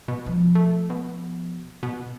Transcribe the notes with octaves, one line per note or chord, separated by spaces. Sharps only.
B2
F3
A3
B2
B2